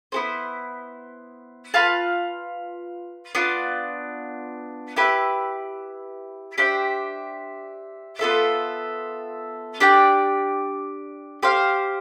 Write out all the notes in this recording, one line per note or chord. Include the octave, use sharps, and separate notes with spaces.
B3 E4 A4 C5
F4 B4 F5 A5
B3 D4 F4
E4 G4 B4 E5
D4 G4 C5 E5
B3 F4 A4 E5
D4 G4 D5 G5
G4 C5 F5